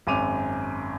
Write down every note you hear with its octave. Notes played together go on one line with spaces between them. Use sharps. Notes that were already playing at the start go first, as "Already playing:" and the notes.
G#1 F#2 D6 D#7 F7